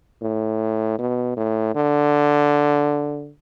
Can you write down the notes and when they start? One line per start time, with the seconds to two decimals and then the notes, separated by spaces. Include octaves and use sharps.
0.21 A2
0.99 B2
1.37 A2
1.75 D3